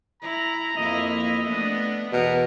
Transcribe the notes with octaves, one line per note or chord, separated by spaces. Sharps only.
E4 A#5
F2 A#3 E4 D#5
D#5
A3 B3 D4
E2 B2 A#4